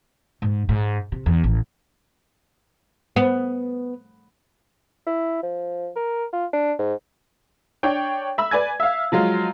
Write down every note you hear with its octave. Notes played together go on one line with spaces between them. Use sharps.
G#2
G#2
C3
E2
A1
B3
E4
F3
A#4
F4
D4
G#2
D4 C#5 G5
E5 B5 E6
B4 D5 G#5 G#6
E5 F5
F3 F#3 G#3 F4